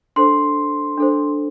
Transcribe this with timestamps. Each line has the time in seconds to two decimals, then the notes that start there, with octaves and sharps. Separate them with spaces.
0.16 D4 A4 C5 C6
0.98 D4 A4 C5